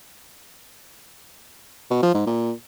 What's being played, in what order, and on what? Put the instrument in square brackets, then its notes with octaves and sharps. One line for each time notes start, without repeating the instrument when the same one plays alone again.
[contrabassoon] B2
F3
G#2
A#2